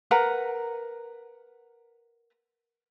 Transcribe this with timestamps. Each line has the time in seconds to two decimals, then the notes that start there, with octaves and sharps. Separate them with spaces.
0.11 A#4 B4 F#5 A#5